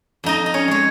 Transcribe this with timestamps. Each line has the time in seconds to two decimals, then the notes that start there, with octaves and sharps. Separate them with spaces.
0.24 F2 D#4 D#5
0.46 D#5
0.54 C#4 C#5
0.68 G#3 C#5